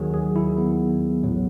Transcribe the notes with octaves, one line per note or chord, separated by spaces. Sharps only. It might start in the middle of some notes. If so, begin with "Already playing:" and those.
Already playing: D#2 D#3 F#3 G#4
G#4
E4
B3
A1 A2 F#3